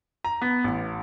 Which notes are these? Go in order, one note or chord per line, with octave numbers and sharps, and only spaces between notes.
A#5
B3
A1